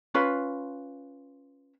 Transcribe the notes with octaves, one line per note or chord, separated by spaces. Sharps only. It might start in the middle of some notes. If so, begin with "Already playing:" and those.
C#4 F4 B4